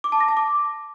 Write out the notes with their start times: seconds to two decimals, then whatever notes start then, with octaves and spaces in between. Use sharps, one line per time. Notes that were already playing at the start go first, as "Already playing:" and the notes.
0.04 D6
0.12 A5
0.20 A#6
0.29 A5
0.37 D6